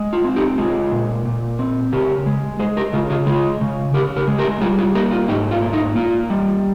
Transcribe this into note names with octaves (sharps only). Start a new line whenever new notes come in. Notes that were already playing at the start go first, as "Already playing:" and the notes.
Already playing: G#3
F4
C4
D#4 G4
G#3 F4 G#4
A#2
A#2
C4
C#3 G4 A#4
G#3
G#3 G#4 C5
G4 A#4
C#3 F4 G#4
F4 G#4
G#3 F4 G#4
C#3
C#3 G4 A#4
G4 A#4
G#3
G4 A#4
G3 F4 G#4
F4 G#4
A#3 G4 A#4
F4
G#2 D#4 G4
F4
A#3
D#4
A#3 F4
G3